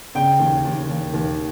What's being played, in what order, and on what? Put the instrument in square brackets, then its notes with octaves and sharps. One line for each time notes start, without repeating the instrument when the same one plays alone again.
[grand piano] C#3 G5
D#2
D#2
D#2
D#2